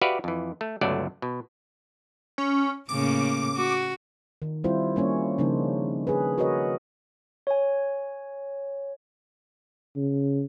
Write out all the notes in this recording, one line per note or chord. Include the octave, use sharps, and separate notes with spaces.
F#4 G4 B4 D5 E5 F5
F2 E3
A3
G1 C#2 F#3 A3 D5
B2
C#4
A2 C#3 A#3 D6
F#4
D#3
G3 C4 E4 F4 C5
G3 A#3 C#4 C#5
C#3 F3 A#3 D4 D#4 C5
G#4 B4
F#4 A#4 B4 C#5 D#5
C#5 G#5
C#3